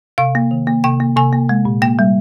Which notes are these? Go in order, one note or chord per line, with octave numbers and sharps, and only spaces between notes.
C3 F5
A#3
D#3
A#3
C3 G5
A#3
C3 G#5
A#3
G#3
A#2
A#3 G5
G3